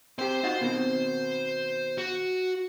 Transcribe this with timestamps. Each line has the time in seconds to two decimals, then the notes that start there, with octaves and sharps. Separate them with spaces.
0.19 C4 G4 C5 C6
0.43 D#4 F4 F#4
0.61 B2 D#3 C4
1.98 F#4